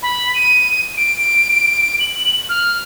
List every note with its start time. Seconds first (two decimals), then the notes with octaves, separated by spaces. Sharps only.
0.03 B5
0.35 D#7
0.97 D7
2.00 F#7
2.49 F6